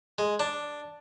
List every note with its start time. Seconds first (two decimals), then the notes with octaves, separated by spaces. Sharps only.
0.18 G#3
0.40 D4